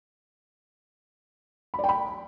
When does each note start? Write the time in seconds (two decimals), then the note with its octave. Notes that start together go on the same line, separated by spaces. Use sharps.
1.74 B5
1.79 D5
1.84 G5
1.89 B5